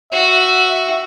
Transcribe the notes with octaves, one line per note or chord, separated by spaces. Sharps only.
F#4 E5